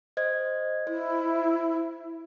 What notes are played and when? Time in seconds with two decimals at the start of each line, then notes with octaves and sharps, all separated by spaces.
0.17 C5 D#5 G#6
0.87 E4 C5